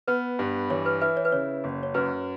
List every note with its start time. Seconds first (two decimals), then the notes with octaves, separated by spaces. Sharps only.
0.08 B3 B4
0.39 G2
0.70 E3 C#5
0.86 B4
1.01 E4 B4
1.17 C#5
1.25 B4
1.32 C#3 C#5
1.64 F#1
1.83 C#5
1.94 F#2 B4